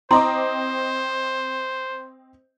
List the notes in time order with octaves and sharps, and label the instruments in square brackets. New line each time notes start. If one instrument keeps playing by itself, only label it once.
[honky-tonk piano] C4 D#5 D6 [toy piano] E4 A#5 C6 [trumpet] C5